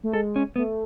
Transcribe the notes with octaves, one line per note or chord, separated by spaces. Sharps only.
A3
G#3 A4
C#4
A3 B3